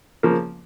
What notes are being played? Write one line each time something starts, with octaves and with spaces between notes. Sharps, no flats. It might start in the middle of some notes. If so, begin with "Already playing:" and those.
C#3 F3 A#3